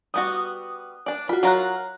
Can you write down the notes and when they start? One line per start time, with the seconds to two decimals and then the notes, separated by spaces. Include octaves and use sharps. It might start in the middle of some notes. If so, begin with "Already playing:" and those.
0.14 G3 B3 F#4 D#6
1.06 D4 D5
1.29 F4 F#4 B5
1.43 F#3 F4 A#4 F#5 A#5 F#6